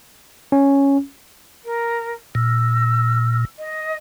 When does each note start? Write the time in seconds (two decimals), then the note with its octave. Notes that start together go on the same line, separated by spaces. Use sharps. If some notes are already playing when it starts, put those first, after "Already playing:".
0.52 C#4
1.65 A#4
2.35 A#2 E6
3.58 D#5